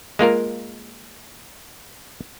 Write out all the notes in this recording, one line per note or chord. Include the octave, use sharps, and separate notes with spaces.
G#3 A#3 F4 A#4